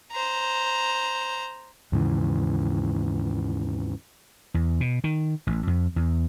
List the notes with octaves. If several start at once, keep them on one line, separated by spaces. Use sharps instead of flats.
C5 A#5
D#2 G#2 C#3 E3
E2
B2
D#3
A1
F2
E2